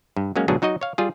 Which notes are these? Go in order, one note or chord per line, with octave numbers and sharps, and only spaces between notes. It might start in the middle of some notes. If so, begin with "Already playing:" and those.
G2
F#3 G#3 A#3 C#4
G1 G#2 B2 F#3 D4 G#4
F#3 D#4 F#4 D#5
C#5 F5
G3 F4 G#4